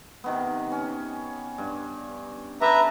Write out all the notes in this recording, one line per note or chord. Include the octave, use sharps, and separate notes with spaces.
C3 D#3 B3
C#4
G2
G4 B4 E5 A5 A#5